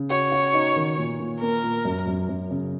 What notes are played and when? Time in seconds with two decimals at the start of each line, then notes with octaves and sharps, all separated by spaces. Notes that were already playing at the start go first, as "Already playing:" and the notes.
Already playing: C#3
0.10 F#4 C#5
0.32 F#4
0.54 D#4
0.76 D#3
0.98 A#2
1.20 A#2
1.41 A#3 A#4
1.63 A#2
1.85 F#2
2.07 F#2
2.29 F#2
2.51 C#3